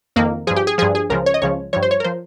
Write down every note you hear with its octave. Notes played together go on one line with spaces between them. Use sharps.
F2 D#3 A#3
G2 F3 G#4
G4
G#4
G2 F3 G#4
G#4
C#2 C#3 F3 A#4
C#5
D#5
C#2 C#3 F3 C#5
G2 F3 C#5
C5
C#5
A#4
F3 C5